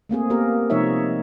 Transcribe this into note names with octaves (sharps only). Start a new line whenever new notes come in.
A3 A#3 C4 G#4
A#3 B3 G4 A#4
C3 F3 G#3 D#4 C#5 E5